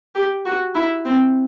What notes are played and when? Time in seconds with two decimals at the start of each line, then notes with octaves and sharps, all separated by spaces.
0.15 G4
0.45 F#4
0.75 E4
1.05 C4